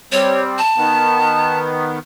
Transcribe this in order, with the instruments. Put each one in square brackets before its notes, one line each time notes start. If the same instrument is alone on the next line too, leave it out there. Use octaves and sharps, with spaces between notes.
[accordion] G3 C4 [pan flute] C#5
[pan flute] A5
[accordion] D#3 B3